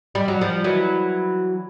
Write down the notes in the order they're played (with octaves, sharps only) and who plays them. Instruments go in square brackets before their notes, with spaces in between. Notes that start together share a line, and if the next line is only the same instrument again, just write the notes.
[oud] G3
F#3
F3 G3
E3 F#3